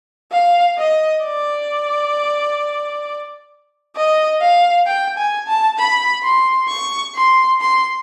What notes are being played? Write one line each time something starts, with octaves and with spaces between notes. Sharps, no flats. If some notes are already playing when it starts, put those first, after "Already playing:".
F5
D#5
D5
D#5
F5
G5
G#5
A5
B5
C6
C#6
C6
C6